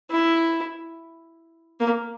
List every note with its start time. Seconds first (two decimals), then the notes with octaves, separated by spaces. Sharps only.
0.11 E4
1.80 A#3